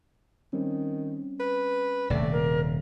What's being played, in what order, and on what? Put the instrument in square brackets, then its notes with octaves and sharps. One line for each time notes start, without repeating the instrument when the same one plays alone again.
[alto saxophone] D#3 [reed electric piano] G3 C4 C#4
[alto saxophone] B4
[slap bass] D#1 C3 [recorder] A3 [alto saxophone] D5
[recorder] A#4